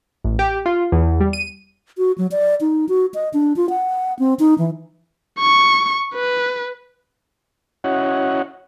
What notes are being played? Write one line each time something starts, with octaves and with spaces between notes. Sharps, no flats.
A1
G4
F4
E2
G3
D#7
F#4
F#3
D5
D#4
F#4
D#5
D4
F4
F#5
C4
D#4
E3
C#6
B4
C#4 E4 F#4 C#5 D#5 F#5